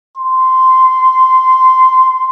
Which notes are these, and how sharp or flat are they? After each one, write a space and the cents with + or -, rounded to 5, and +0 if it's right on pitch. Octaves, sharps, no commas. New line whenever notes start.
C6 -10